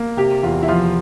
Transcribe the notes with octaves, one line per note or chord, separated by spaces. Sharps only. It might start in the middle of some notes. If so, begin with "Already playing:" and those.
Already playing: A#3
C3 G4
E2 F4
E4
F3 F4